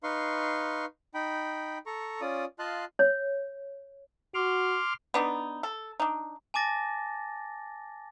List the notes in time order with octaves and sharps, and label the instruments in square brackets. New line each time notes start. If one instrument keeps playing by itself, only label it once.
[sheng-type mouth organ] D#4 B4 F5 C6 C#6
D#4 G5 B5
A4 A#5 C#6
C#4 F4 D5 D#6
F4 D#5 F5 A5 C6 F#6
[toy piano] C#5
[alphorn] F#4 [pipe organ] C6 D6 F6
[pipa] B3 D4 D#4
A4
D4 D#4
[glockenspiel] G#5 A5 D6 A6 A#6